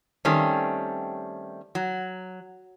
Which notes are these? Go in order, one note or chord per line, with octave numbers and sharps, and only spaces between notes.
D#3 G3 A3 C4 C#4
F#3